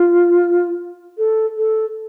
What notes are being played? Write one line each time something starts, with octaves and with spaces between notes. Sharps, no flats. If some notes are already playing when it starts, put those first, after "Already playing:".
Already playing: F4
A4
A4